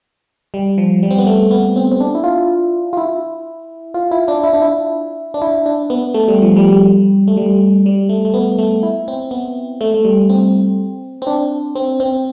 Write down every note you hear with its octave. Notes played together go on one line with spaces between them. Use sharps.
G3
F3
G3
C4
B3
A3
B3
C4
C4
D4
E4
F4
F4
E4
F4
E4
D4
E4
D4
E4
D4
E4
D4
B3
A3
G3
F3
G3
A3
G3
G3
A3
A3
B3
A3
E4
C4
B3
A3
A3
G3
C4
C4
D4
C4
C4